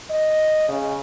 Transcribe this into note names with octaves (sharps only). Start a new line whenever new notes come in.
D#5
C#3